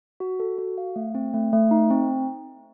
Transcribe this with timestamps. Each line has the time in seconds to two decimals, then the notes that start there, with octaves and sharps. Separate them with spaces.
0.20 F#4
0.40 A4
0.58 F#4
0.78 F5
0.96 A3
1.15 C4
1.34 A3
1.53 A3
1.71 D#4
1.90 C4